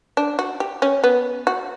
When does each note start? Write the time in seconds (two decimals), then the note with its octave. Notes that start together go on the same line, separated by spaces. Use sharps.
0.17 D4
0.39 F#4
0.60 G4
0.82 C#4
1.04 B3
1.47 F#4